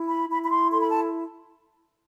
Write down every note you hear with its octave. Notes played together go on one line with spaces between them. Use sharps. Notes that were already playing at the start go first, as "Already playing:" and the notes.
Already playing: E4
B5
E4 B5
B5
C6
A4 C6
B5
A5